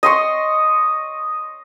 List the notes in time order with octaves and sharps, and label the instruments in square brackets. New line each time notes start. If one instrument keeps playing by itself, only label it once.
[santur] D#5 C6 C#6